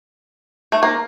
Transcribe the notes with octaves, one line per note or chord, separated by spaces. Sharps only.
A3
A#3